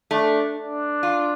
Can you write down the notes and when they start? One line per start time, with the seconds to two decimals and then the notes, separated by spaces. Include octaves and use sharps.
0.11 A3 D4
0.57 D4
1.03 F4